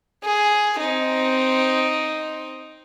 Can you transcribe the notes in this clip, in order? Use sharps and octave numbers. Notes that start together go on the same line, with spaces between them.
G#4
C4 D#4